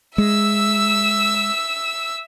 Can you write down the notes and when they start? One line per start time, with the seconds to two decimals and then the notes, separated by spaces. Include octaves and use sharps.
0.18 G#3 E5 E6